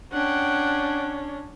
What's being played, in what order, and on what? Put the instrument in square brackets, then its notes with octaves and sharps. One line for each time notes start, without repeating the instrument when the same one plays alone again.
[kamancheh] C#4 D4 [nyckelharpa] F#5 G5